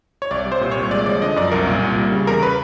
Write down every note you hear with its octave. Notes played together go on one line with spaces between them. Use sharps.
C#5
C2 D5
G3
C5
A#2
C#5
C2
G#3 D5
F3 D5
D3 D#5
F#2 D5
C2 A#4
A#2
C2
G3
C#3
E2 A#4
B4